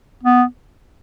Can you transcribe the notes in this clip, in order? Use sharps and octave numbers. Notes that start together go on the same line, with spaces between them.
B3